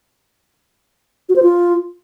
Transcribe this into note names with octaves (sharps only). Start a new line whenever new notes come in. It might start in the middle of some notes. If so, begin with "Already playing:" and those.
F#4
C5
F4